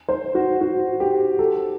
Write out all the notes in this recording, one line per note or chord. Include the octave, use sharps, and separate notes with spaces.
C5
F#4
F#4
G4
A4